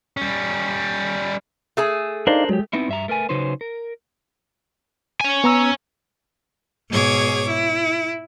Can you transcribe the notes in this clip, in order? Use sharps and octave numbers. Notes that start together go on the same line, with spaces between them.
G3 C#4
A3 G#4 G#5
D4 D#4 A#4 C5 D5 F5
F#3 G#3 G4
B3 C4 D#4 E4
G2 E5 A#5
A3 A#4 B4 G#5
C#3 F#3 D#4 B4 C5
A#4
C#5 G#5
B3 A#5 E6
G#2 B2 G#4 C#5 D6 G#6
E4